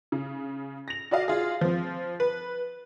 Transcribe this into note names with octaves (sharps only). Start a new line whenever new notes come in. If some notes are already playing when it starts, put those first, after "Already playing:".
C#3
A#6 F7
F#4 D5 D#5 F5
F4 G#4
F3 C4
B4